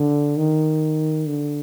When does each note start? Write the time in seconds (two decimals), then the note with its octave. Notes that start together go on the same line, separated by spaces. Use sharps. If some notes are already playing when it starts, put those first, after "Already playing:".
Already playing: D3
0.37 D#3
1.28 D3